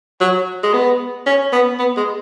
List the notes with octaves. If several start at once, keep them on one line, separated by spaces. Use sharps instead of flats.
F#3
G#3
B3
C#4
B3
B3
G#3